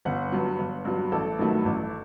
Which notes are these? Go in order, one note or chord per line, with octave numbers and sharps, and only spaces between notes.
G1 F#5
G2 F#3
G1
G2 F#3
A1 A4
G2 D#3 F#3 A3
A1